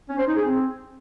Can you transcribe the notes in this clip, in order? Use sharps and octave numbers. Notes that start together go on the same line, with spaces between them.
C#4
C5
D#4
G#4
C4